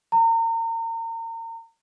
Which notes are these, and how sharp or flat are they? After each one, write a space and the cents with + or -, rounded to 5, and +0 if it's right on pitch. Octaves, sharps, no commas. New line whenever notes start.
A#5 -35